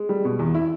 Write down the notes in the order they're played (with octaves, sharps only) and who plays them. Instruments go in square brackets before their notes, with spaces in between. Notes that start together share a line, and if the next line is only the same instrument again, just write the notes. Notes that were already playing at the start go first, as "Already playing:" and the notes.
Already playing: [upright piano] G#3
G3
B2
E2
E4